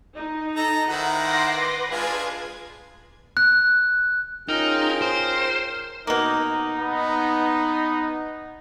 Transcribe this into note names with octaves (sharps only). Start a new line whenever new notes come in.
D#4
A4 A#5
D#3 E4 C5 F#5
C6 D6 A#6
B4
G#3 D4 F4 G#4 G#6
F#6
C#4 D#4 F4 G#4 A#4 G5
C5
B2 A#3 D#4
B3